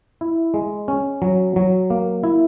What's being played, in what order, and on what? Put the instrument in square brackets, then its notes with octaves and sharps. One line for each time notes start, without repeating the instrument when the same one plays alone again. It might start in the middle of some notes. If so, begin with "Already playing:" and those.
[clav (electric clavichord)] E4
G#3
C#4
F#3
F#3
A#3
E4